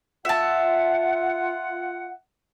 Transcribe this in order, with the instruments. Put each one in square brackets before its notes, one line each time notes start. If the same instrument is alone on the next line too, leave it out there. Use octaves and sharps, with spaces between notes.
[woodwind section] F4 F#5 [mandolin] E5 A5